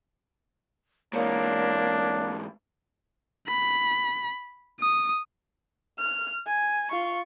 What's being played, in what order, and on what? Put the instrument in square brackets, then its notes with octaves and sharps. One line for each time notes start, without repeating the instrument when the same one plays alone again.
[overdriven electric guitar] G#2 E3 [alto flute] A#3 [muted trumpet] D4 [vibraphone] C#5 D5
[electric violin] B5
D#6
[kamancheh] F6
G#5
F4 C#6